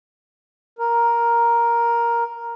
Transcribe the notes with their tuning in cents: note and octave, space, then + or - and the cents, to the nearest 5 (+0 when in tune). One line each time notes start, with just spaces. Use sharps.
A#4 +10